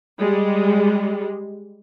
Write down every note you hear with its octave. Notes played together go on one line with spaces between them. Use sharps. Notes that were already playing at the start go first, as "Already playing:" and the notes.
G3 G#3